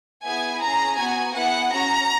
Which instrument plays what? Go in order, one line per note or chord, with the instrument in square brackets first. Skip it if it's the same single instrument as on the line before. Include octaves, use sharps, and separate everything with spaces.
[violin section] B3 E4 G#4 G#5
C#4 G#4 A#5
B3 F#4 G#5
B3 E4 G#4 F#5
C#4 F#4 A#5